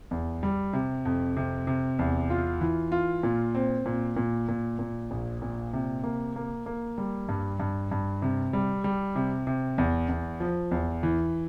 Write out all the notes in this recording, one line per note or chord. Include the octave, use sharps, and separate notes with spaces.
E2
G3
C3
F2
C3
C3
E2
F4
E3
F4
A#2
C4
A#2
A#2
A#2
A#2
A#1
A#2
C3
A#3
A#3
A#3
G3
G2
G2
G2
C3
G3
G3
C3
C3
E2
E2
F3
E2
E3